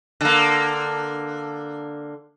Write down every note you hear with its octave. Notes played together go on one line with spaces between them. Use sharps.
D3 A#3